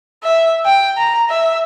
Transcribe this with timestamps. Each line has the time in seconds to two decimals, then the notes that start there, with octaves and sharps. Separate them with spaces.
0.23 E5
0.66 G5
0.97 A#5
1.30 E5